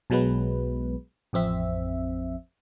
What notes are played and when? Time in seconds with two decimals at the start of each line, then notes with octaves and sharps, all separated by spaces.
0.10 B1 B2 F#3 G#3 B3 B4
1.33 A1 F2 C4 E5